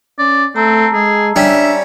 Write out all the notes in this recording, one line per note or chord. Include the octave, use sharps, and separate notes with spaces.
C#4 D5
A3 C4 A5 A#5 E6
G#3 G#4
G3 C#4 D4 E5